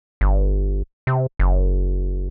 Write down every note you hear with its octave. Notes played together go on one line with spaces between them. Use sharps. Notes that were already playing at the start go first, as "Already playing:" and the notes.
G1
C3
F#1